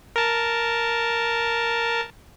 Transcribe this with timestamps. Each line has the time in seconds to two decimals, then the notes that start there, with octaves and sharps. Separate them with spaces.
0.16 A#4 A5